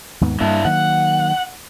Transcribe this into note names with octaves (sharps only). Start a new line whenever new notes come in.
D#2 G#2 B3
G2 G3 A#3 D4 E4
D#3 F#3 A#3 F#5